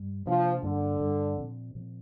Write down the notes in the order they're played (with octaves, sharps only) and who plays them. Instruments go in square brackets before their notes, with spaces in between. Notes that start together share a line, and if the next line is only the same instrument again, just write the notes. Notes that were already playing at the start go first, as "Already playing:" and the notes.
Already playing: [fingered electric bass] G2 G3
[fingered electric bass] C3 A#3 D4 [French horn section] F3
[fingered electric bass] G2 G3 A#3 D4 [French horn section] D3
[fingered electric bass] G2 G3 D4
A#2 F3 C4
A#2 F3 C4